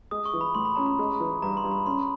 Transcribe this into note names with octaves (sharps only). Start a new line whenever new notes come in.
G#3 D#6
C#6
E3
B5
A2 C6
B5
C#4 A#5
B5
G#3
E3
G2 A#5
C6
G2
B5
C#4 C6